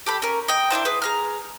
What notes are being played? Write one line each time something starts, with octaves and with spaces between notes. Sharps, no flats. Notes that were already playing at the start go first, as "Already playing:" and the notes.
G4 A4 B5
C#4 A#4
D#5 G5
D4 E4 F4 C5
G#4 B4
G#4 A#5 F6